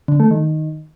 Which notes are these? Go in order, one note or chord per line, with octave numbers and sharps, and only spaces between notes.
D3
A3
D#3